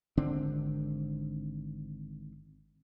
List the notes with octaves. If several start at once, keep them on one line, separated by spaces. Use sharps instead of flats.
G#1 D3 C4 D4